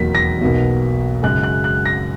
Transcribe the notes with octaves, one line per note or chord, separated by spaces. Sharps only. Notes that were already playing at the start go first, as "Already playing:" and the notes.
Already playing: E1 D#2 D#3 F#3 A#3 B6
A#6
B1 B2 A#3
F#2 C#3 G#3 F#6
F#6
F#6
A#6